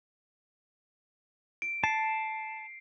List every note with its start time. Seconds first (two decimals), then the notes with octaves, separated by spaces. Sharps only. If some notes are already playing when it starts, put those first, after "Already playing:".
1.62 D7
1.84 A5 C7